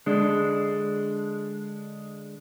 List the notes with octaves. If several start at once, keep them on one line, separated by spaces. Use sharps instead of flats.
D3 G#3 D4